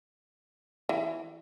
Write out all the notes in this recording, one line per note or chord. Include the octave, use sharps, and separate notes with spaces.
E3